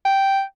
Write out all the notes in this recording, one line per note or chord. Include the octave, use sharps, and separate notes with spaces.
G5